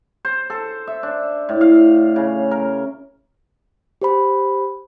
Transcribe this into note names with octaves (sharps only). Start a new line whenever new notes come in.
C5
A4
E5
D4
A2
F5
C#3
A#4
G4 C5 B5